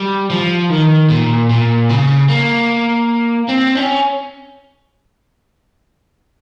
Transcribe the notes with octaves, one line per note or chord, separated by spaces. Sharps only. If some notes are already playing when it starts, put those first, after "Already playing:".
Already playing: G3
F3
D#3
A#2
A#2
C#3
A#3
C4
C#4